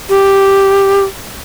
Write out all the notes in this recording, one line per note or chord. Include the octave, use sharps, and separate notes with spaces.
G4